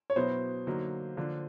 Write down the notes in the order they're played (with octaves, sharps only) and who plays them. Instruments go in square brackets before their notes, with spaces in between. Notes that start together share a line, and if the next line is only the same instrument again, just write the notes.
[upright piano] C#5
[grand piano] B2 F#3 B3 E4 [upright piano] C5
[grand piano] D3 F#3 A#3 D#4
D3 F3 A#3 D4 F4